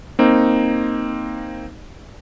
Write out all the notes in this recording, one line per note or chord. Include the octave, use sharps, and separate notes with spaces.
A#3 C4 D#4